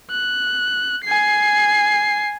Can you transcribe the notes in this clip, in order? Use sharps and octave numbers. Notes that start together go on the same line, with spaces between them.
F#6
G#5 C7